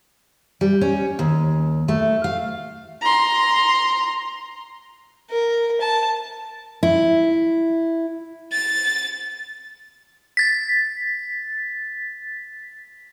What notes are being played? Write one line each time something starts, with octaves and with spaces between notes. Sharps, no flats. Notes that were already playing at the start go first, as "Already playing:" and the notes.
G3
C#4
D#2
A3
F5
A#5 C6
A#4
A5
E4
A6
A6 B6